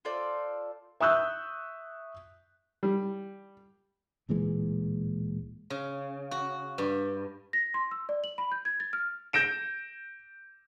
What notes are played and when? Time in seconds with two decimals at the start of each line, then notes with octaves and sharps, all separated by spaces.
0.05 F4 A4 C5 D5
1.00 E5 C#6 D#6 E6 F#6 G6
2.83 G3
4.29 D1 A#2 E3 G#3
5.70 C#3
6.31 F#4
6.78 G2
7.53 A#6
7.74 C6
7.91 E6
8.09 D5
8.24 F#7
8.38 B5
8.52 G6
8.65 G#6
8.80 A6
8.93 F6
9.33 G6 A#6 D7 E7